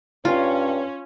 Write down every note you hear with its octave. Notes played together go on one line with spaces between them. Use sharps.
G2 C#4 F4